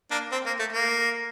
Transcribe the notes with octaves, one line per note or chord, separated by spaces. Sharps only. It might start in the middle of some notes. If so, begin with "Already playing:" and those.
A#3 D4
C4
A#3
A3
A#3